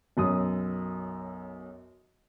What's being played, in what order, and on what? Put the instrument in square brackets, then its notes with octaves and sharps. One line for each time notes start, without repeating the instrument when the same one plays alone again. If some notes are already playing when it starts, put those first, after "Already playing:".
[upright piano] B1 F#2 D#6